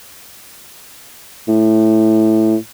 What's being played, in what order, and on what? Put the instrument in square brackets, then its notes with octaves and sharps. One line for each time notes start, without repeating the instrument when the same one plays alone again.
[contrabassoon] A2